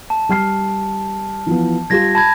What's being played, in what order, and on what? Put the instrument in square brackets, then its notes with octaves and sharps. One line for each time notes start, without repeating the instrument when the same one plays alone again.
[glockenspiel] A5
[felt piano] G3 F6 C7
E3 F3 B3
[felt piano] G3 F4 G4 [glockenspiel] G#6 A#6
[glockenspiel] A5 B5 G#6